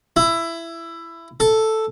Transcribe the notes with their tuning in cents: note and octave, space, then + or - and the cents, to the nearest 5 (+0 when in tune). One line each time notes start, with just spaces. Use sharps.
E4 +15
A4 +0